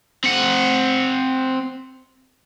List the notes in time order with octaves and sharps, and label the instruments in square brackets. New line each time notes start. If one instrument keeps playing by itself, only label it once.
[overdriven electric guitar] C4 F#5